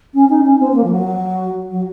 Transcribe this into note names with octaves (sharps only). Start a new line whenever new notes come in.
C#4
D#4
C#4
C4
C4
A#3
F3
F#3
F#3